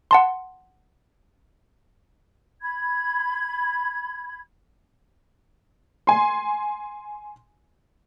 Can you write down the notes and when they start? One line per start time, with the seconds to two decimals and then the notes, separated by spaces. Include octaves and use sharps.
0.11 F#5 A5 C6
2.62 B5 G#6
6.07 G#5 C6